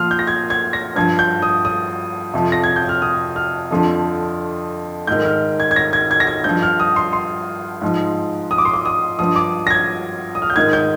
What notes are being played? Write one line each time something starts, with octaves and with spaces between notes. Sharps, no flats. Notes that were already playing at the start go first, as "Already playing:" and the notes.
Already playing: A#2 F3 C6 D#6 F6
G6
A#6
G#6
G#6
A#6
G2 F3 G#6
G6
D#6
D#6
F2 C3 F3
A#6
G#6
G6
F6
D#6
F6
F2 D3 F3
G#2 D#3 G6
F6
G#6
G#6
A#6
G#6
G#6
A#6
G#6
G2 F3 G6
F6
D#6
C6
C6
G#2 F3
D#6
D6
C6
D6
D#6
G2 F3 D#6
D6
A#6
G#6
D#6
F6
G6
G#2 D#3 G#6
G6